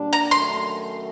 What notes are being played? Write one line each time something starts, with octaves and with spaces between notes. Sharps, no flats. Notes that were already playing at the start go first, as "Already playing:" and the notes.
Already playing: A#2 G3 D4
A#5
F#2 D#3 A3 C6